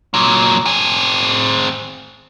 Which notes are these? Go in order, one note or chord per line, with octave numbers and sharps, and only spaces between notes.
A#2 F#3
C4 G#4